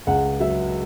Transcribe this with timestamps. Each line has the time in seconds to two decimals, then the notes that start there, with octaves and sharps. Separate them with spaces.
0.07 C#2 F#5
0.40 F#3 E5